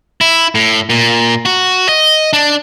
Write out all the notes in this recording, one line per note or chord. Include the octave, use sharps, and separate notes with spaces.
E4
A2
A#2
F#4
D#5
D4